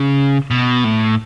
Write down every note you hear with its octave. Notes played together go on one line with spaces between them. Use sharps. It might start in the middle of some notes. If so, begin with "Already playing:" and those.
Already playing: C#3
B2
A2